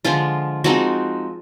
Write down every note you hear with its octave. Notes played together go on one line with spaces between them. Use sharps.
D3 F3 G#3 F4
F3 G#3 C4 D#4 F#4